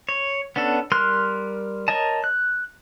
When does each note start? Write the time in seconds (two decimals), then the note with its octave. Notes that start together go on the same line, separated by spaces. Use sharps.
0.09 C#5
0.56 B3 C#4 D4 A4
0.92 G3 A#4 C6 F6 F#6
1.88 A#4 C#5 D#5 A5
2.24 F#6